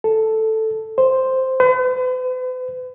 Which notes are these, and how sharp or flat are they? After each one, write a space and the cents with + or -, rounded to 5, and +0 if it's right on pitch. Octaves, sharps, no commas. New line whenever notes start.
A4 +0
C5 +0
B4 +45